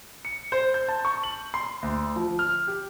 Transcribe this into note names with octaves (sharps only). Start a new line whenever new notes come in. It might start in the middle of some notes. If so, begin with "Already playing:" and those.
C#7
C5
G6
A5
C#6
F#7
C6
D2
F3
F6
G4